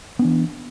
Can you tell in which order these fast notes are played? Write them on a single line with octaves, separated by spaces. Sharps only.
B3 D4 E3